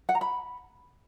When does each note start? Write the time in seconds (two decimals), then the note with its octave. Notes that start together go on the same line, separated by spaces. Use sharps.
0.09 F#5
0.15 A#5
0.21 B5